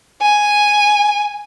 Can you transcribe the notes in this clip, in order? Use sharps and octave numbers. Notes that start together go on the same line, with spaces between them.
G#5